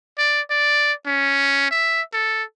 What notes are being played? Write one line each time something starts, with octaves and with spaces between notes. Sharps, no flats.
D5
D5
C#4
E5
A4